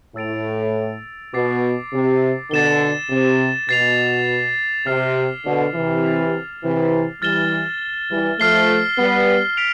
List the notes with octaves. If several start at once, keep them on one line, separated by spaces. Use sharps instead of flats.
A2 E6 A6 D7 F7
B2 D6 A6 C7
C3
B2 D3 A6 E7 G7
C3
B2 A6 C7 F7
C3 F6 A6 C7 F7
B2 D3
C3 E3
A6 C7 F7
C3 E3
E3 G3 F6 A6 E7 G7
E3 G3
F3 A3 F6 C7 G7
G3 B3
B6 D7 F7